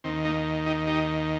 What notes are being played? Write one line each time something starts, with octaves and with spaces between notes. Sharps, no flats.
D#2 D#3 C4
A#3 D#4
D#4 G4
D#4 G4